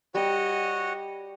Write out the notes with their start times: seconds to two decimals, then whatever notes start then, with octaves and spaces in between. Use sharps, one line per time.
0.14 G3 F#4 C#5 D#5 F#5 G5